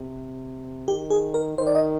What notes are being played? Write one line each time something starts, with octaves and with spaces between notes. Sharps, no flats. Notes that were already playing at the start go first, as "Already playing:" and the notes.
Already playing: C3
D#3 G4
G#4
A#4
D#3 C5
D5
D#5